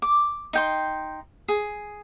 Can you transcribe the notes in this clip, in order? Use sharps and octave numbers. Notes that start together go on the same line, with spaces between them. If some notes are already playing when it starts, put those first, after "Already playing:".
D6
D#4 G5 C6
G#4